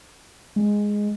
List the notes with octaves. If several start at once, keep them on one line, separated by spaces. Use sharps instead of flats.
G#3